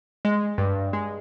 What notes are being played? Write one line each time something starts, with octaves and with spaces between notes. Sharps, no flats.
G#3
G2
G#3